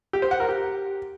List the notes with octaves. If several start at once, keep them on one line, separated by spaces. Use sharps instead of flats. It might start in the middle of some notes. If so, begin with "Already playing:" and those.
G4
C5
F#5
A#4
G4